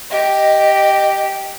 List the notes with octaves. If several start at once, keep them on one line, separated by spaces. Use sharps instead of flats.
G4 D#5